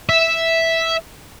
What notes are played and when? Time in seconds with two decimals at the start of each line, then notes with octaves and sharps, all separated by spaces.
0.09 E5